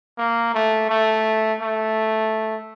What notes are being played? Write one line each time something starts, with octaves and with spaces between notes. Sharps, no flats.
A#3
A3
A3
A3